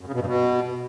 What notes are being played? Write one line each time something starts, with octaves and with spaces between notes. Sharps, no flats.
F#2
C#3
B2
G2
B2